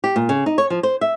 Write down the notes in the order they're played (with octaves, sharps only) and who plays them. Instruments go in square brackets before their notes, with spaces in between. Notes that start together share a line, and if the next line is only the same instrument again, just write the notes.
[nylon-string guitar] G4
A#2
C#3
D#4
C#5
F3
C5
E5